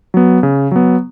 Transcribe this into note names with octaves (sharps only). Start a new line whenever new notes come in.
F#3 B3
C#3
F#3 B3